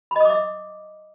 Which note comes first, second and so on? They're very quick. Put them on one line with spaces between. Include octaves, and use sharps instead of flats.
B5 D#5 D#6 D6 E5